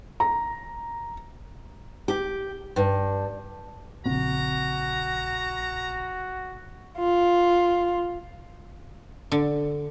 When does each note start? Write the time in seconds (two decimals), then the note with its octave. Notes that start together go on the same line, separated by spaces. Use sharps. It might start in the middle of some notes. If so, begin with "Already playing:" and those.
0.20 A#5
2.08 G4
2.76 G2
4.06 A#1 C#3 C4 F#4 A#5
6.98 F4
9.32 D3